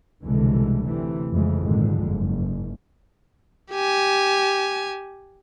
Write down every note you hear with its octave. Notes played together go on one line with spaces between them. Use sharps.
F1 C2 B2 D3 E3 G#3
D2 C3 E3 A3
F2 C#3 E3 G#3
G#1 F2 A#2 D3 G#3
F#1 G#2
G4 G#5